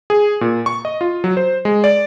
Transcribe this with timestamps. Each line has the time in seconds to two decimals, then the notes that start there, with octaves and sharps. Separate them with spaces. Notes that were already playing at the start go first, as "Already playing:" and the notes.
0.10 G#4
0.41 A#2
0.66 C#6
0.85 D#5
1.01 F4
1.24 F#3
1.37 C5
1.65 G#3
1.84 D5